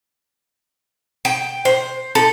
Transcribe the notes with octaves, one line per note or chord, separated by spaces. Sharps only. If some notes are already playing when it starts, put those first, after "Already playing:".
G5
C5
A4